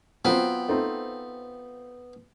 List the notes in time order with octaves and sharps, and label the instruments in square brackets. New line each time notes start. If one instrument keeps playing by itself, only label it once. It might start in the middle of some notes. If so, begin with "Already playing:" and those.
[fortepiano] F#3 C4 [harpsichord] B3 [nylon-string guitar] F4 C5 G5
[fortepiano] A3 C4 D#4